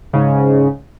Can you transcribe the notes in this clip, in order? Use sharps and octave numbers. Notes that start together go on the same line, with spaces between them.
G#2 C#3